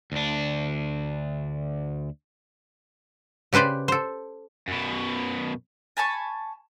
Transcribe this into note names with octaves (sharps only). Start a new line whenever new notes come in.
D2 D4
C#3 G4 B4 C5 D5
A4 C5
F#2 B2
G#5 A5 B5 C#6